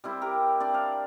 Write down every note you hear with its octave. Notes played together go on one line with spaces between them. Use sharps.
G3 C4 E4
G4 A#4
C4 D4 D5
F5